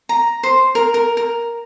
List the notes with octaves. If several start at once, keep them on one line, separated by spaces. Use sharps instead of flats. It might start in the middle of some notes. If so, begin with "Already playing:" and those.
A#5
C5
A#4
A#4
A#4